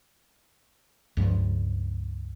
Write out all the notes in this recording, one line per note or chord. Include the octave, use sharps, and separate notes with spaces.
C#2 G2 F3